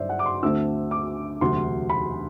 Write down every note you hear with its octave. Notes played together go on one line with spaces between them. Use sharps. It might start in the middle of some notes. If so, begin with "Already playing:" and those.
Already playing: G1 G2 F#3 C4 E4 C5 D5 E5
F#5
D6
C6
D2 D3 A3 C4 E6
D6
E1 D2 C3 F#3 C6
B5